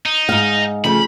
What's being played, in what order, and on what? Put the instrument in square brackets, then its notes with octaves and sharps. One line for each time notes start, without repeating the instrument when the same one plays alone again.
[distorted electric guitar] D#4
[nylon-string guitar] G#2 F5
[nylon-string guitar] C#3 F3 A3 [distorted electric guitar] B5